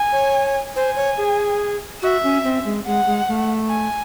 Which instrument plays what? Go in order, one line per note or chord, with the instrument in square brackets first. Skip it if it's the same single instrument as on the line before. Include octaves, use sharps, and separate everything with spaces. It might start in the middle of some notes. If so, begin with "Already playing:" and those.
Already playing: [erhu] G#5
[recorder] C#5
[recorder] C5 [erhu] G#5
[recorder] C#5
G#4
[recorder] F#4 [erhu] E5
[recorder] C#4
C4
G#3
[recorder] G#3 [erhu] F#5
[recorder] G#3
A3
[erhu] G#5